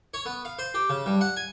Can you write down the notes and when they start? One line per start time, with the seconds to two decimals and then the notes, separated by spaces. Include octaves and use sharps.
0.14 C#5
0.26 B3
0.45 F5
0.59 C5
0.74 G4
0.89 C#3
1.06 G2
1.21 F#5
1.37 G#5